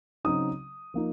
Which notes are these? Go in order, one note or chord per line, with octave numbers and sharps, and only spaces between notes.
C#3 F#3 C4 D#4 D#6
F3 A#3 D#4